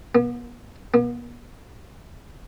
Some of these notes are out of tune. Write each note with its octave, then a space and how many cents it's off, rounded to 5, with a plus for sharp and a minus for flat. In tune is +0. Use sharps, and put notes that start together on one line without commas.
B3 -40
B3 -45